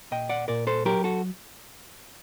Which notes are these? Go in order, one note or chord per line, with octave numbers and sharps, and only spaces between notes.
A#2 D#5 G5
D5 F#5
A#2 A#4 D5
A4 C5
F#3 G4 A#4
F#4 A4